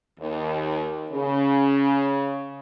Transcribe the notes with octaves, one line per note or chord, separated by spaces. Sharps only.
D#2
C#3